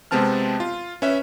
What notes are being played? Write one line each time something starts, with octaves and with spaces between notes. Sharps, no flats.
C3 G#3 B3 C4 A5 F6
F4
C#4 B4 E5